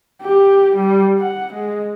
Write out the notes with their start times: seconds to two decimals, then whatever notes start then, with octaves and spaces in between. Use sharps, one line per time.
0.22 G4
0.76 G3
1.19 F#5
1.54 G#3